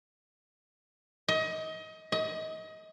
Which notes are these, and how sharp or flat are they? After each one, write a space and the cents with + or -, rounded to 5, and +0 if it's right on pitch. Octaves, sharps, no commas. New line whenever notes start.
D#5 +30
D#5 +30